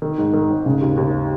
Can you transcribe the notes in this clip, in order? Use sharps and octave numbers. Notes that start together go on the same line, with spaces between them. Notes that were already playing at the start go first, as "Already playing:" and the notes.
D#3
G#2
D#3
G#1
C#3
D#2
D#2